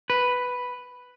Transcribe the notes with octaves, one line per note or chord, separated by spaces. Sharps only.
B4